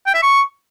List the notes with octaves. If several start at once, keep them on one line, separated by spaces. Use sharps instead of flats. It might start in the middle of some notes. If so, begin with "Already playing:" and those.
G5
E5
C#6